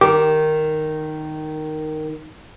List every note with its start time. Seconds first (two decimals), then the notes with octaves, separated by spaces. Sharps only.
0.01 D#3 G4